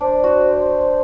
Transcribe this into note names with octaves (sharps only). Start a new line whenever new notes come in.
D4 C5
F#4